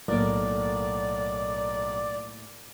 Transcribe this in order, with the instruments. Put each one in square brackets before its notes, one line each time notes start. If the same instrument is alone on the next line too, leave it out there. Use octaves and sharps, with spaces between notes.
[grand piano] B1 A#4 [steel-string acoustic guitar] A2 A#3 [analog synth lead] D5